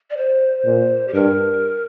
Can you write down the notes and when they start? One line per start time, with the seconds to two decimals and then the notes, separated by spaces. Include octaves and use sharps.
0.10 D5
0.17 C5
0.65 A#2
1.08 G4
1.14 G2 A#4